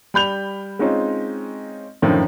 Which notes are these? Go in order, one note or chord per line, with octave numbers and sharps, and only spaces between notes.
G3 B5 G6 F7
G#3 C4 C#4 D#4 F4
F#2 A2 D3 D#3 F3